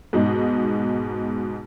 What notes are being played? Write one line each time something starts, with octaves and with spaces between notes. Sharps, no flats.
G#2 B2 D#4